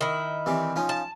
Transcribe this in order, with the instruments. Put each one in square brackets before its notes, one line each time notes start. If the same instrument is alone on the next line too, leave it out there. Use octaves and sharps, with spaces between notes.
[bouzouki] D#3 E4
[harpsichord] C3 E3 G3
F3 C#4 D#4
[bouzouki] A5